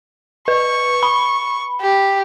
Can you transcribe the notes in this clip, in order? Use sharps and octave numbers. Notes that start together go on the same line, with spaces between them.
B4 C#6
B5
G4